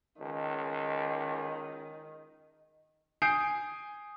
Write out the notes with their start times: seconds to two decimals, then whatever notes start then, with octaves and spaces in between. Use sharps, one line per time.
0.21 C#2 D#3
3.22 G#5 D#6 G6 C7 D7